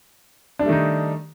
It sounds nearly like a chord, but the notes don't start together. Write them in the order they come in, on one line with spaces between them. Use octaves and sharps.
D4 G3 A3 D#3 D#4